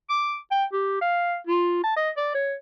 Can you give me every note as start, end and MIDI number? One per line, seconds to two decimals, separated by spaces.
0.10 0.36 86
0.51 0.65 79
0.73 1.00 67
1.01 1.36 77
1.47 1.82 65
1.84 1.94 81
1.96 2.11 75
2.17 2.30 74
2.35 2.54 73